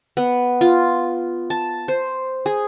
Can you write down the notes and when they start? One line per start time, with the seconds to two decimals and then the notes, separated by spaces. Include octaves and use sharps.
0.17 B3
0.61 F4
1.50 A5
1.88 C5
2.46 G#4